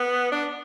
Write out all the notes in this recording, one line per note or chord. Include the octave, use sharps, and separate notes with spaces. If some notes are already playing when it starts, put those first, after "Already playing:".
Already playing: B3
D4